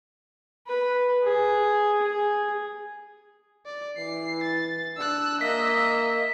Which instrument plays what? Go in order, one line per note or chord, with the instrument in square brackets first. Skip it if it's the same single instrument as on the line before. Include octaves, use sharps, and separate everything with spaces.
[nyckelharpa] B4
G#4
G#4
[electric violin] D5
[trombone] E3 [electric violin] C7
[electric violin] A6
[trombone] D4 [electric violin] E6 F#6
[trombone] A#3 [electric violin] D#5 E5 [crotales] B6